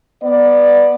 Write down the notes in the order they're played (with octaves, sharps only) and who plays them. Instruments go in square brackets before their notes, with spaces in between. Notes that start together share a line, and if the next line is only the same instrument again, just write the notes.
[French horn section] B3 D5